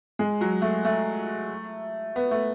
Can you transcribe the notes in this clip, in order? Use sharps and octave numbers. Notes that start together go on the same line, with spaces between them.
G#3
F#3
A3
A3
B3
A3